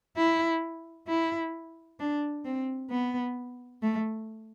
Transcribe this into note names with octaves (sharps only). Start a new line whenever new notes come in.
E4
E4
D4
C4
B3
A3